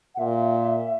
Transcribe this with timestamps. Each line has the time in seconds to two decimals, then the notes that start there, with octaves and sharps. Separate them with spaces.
0.14 F#5
0.18 A#2 E5